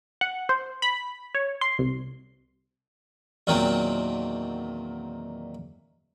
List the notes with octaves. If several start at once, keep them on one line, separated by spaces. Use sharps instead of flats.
F#5
C5
B5
C#5
C6
C2
E2 A#2 D#3 F#3 C4